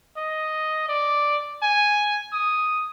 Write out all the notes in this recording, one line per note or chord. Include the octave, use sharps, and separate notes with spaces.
D#5
D5
G#5
D#6